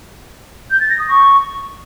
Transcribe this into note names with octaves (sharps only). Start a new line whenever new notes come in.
G6
A6
A#6
D#6
C#6